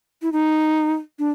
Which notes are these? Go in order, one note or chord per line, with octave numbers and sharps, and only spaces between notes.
E4
D#4
D4